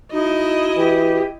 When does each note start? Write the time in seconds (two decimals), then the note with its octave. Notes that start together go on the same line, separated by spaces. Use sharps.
0.12 D#4 E4 F#4 D#5
0.77 E3 G4